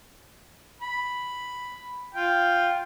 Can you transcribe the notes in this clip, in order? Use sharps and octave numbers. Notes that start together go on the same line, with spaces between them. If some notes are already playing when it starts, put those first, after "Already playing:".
B5
F4 G5